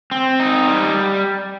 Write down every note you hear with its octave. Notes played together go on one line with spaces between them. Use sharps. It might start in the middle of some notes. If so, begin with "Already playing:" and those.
C4
D#4
G3